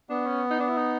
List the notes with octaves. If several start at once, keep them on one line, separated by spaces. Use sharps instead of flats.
B3 D4
C#4
D#4
D4
E4
D#4